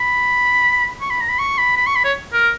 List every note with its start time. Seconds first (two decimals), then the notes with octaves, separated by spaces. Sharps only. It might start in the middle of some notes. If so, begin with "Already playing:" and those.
Already playing: B5
1.01 C#6
1.10 B5
1.21 A#5
1.29 B5
1.39 C#6
1.58 B5
1.77 B5
1.87 C#6
1.96 B5
2.04 C#5
2.33 A#4